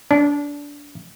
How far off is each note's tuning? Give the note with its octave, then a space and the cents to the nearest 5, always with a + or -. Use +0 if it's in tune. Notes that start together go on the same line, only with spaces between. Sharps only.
D4 -25